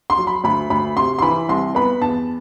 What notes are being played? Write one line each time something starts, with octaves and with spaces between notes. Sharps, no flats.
C6
F#3
B5
D2 B5
D2 B5
C3 C6
C6
E3 B5
C2 C6
B3 B5
E2 A5